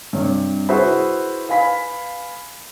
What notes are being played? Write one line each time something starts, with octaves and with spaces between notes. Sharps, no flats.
G2 C3 C#5
E4 F#4 G#4 B4 C5 E5
B4 F5 G#5 B5 B6